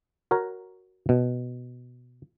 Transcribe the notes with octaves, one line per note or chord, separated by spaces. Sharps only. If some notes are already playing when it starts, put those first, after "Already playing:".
F#4 A#4 C#5 A#5
B2